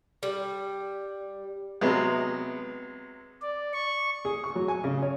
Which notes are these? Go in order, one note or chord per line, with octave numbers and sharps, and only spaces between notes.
G3
C3 F#3 G#3 B3
D5
C#6
G#4
C#6
F#3
G#5
C#3
C#5